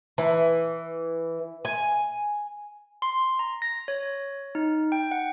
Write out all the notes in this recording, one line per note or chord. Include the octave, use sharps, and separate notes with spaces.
E3
G#5
C6
A#5
A#6
C#5
D#4
G5
F#5